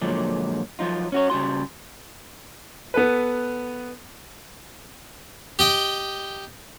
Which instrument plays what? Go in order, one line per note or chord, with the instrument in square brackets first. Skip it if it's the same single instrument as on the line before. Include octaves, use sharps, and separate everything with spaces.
[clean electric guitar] A#2 D3 F3 F#3 G#3
F3 F#3 D#4 F4
C#4 F#4 C#5
C#3 G3 F#4 C6
[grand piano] B3 A4 B4
[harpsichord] G4 D#5 G5